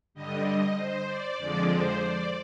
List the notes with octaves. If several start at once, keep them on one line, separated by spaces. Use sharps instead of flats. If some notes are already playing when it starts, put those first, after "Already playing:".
G2 D3 G3 D#5
D#5
C5
D5
F2 D3 F3 G#3 D5
C5
D5